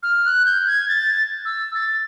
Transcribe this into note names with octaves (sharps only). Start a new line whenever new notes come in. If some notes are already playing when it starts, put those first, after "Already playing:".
F6
F#6
G6
G#6
A6
E6
A6